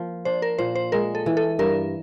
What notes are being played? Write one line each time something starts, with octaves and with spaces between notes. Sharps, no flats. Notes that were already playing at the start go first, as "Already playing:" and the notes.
Already playing: F3 A#3
D4 C5
A#4
A#2 C5
C5
G#3 A#4
A4
E3
A4
G2 A#4